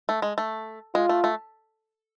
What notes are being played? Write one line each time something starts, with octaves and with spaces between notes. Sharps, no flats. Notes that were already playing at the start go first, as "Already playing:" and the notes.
A3
G#3
A3
G#3 F4
A3
A3